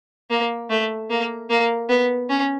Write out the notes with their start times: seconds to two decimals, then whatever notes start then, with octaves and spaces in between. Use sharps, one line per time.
0.30 A#3
0.70 A3
1.10 A#3
1.50 A#3
1.89 B3
2.29 C#4